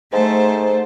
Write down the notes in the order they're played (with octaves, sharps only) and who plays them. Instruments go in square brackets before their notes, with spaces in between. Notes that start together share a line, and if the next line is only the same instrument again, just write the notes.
[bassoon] G#2 [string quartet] A3 A4 C5